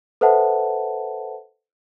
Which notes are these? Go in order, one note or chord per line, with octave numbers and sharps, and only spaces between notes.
A4 B4 C5 E5 F#5 A5